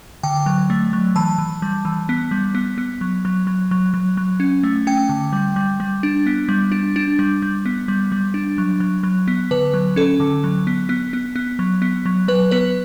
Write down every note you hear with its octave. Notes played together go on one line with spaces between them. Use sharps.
D3 G5
F#3
A3
F#3
E3 A5
E3
G3
E3
B3
G3
B3
B3
F#3
F#3
F#3
F#3
F#3
F#3
C#4
A3
C#4 G5
D3
G3
G3
G3
D4
B3
G3
D4
D4
G3
G3
B3
G3
G3
D4
F#3
F#3
F#3
B3
D3 B4
F#3
C#4 A4
D3
F#3
B3
B3
B3
B3
F#3
B3
F#3
F#3 B4
B3 B4